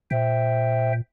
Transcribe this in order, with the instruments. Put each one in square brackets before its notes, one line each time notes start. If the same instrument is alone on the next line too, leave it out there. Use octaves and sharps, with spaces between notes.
[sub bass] A#2 [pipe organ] C5 E5 G5